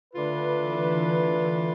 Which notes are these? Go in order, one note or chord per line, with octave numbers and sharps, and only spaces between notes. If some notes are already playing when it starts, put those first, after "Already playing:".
D3 A3 D4 F4 B4
E3
D3